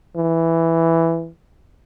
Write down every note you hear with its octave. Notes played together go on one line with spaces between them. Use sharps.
E3